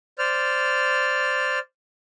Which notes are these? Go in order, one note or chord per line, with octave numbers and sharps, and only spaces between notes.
C5 D5 F6